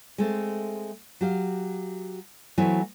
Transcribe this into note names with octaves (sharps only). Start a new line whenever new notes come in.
G#3 A3 C4
F#3 G4 F5
E3 F#3 A3 B3 E4 C5